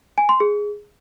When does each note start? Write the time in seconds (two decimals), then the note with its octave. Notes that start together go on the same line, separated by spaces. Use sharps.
0.18 G#5
0.29 C6
0.40 G#4